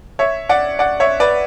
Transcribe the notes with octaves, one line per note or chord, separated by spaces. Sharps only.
C#5 E5
D5 F#5
D5 F#5
C#5 E5
B4 D5